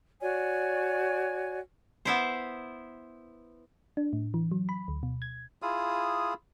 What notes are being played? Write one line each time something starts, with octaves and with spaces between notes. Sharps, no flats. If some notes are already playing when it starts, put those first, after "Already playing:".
F#4 C#5 D5 G#5
B3 E4 C5
D4
A2
E3
F#3
B5
D2
B2
G#6
E4 F4 G#4 D#6